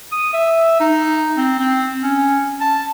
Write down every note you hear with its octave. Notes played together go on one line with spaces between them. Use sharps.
D#6
E5
D#4
C4
C4
C#4
A5